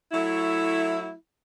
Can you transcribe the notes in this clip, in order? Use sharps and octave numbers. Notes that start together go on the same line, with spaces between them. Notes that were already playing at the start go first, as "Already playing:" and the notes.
F#3 A3 E4